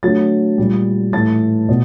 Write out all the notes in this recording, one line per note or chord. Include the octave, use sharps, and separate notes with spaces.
D3 F#3 A3 A6
A#2 G3
A2 E3 A3 A6
B2